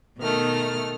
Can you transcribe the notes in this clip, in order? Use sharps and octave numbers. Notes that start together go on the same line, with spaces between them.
B2 D#3 A3 F6